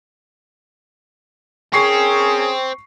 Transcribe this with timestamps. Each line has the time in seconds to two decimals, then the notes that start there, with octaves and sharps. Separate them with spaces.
1.73 C4 C#4 G#4 A#4 C#6 C7